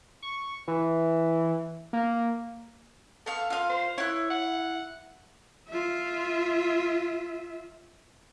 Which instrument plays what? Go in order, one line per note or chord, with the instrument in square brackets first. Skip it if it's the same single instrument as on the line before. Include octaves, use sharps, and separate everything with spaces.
[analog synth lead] C#6
E3
A#3
[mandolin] B3 F5 C#6 [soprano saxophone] A4
[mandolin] F4 F5
[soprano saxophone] C5
[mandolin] E4 F#6 [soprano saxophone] C#5
[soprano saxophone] F#5
[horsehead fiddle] F4 E5